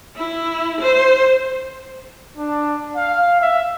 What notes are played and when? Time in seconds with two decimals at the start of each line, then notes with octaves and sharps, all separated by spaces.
0.16 E4
0.81 C5
2.37 D4
2.96 F5
3.42 E5